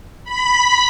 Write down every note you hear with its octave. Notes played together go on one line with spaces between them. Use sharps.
B5 B6